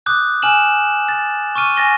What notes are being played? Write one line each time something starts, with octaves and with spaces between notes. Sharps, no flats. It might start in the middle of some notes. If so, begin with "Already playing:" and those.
D6 D#6 F#6 G6
G#5 F6 E7 F#7
A6
C#6 D6 F6 D#7
G#5 A6 A#6 G7